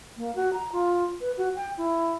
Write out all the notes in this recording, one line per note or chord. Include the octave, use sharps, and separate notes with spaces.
A#3
F#4
A#5
F4
B4
F#4
G5
E4